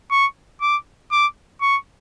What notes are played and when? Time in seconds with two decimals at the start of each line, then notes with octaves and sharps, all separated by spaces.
0.11 C#6
0.61 D6
1.12 D6
1.62 C#6